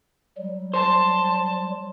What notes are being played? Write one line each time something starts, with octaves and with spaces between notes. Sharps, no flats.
F#3 G3
C5 A5